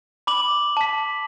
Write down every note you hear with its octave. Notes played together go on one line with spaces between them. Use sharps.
B5 D6 F#7
A5 B6